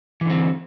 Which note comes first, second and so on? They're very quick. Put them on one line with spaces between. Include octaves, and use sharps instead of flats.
E3 D3 C4